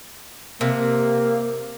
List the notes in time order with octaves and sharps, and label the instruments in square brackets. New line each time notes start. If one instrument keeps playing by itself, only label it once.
[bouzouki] C3 [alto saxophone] A#3